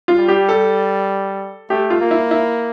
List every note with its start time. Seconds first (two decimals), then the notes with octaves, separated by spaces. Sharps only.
0.08 F4
0.18 G3
0.28 G4
0.49 A4
1.70 A3 G4
1.90 F4
2.01 A#3
2.11 E4
2.31 E4